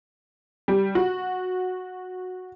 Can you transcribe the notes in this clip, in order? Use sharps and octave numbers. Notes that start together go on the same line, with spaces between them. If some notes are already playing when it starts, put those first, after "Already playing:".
G3
F#4